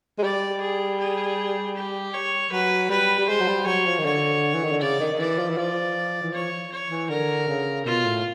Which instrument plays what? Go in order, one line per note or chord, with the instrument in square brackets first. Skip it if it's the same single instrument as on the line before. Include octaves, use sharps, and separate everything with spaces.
[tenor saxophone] G#3
[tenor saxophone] G3 [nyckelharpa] D5
[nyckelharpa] G#4
G#4
G4
C#5
[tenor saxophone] F#3 [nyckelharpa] B4
[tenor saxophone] G3 [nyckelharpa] B4
[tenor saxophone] G3
[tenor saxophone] G#3 [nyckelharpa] C5
[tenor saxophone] F#3
G3
[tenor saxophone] F#3 [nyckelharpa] C#5
[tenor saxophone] F3
D#3
[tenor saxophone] D3 [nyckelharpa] C#5
[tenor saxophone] E3
D#3
D3
[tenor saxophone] C#3 [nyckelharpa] D5
[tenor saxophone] D#3
D#3
[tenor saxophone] E3 [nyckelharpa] D5
[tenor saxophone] F3
E3
[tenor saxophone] F3 [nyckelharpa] D5
[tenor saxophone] E3
[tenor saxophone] F3 [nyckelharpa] C#5
[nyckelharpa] C#5
[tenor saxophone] E3
[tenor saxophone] D3 [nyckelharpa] A#4
[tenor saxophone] C#3
[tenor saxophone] B2 [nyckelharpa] F4
[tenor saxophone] A2